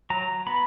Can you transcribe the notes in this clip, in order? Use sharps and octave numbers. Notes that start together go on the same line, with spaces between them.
F#3 A#5
B3 B5